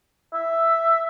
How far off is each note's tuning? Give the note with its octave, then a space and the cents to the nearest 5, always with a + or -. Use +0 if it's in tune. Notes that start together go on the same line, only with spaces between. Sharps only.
E5 +5